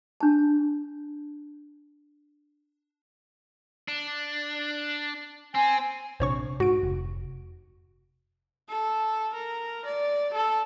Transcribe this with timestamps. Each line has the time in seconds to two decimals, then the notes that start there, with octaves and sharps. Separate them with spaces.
0.21 D4 A5
3.88 D4
5.55 C4 G#5
6.20 A#1 C3 D4 C5 C#5 C#6
6.60 G#2 F#4 D7
6.83 F1
8.69 A4
9.34 A#4
9.86 D5
10.33 A4